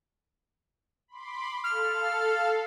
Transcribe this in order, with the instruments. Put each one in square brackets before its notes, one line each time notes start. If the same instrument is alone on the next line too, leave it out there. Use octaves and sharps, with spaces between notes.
[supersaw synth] B5 C6 D6
[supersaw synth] A4 F5 [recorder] F6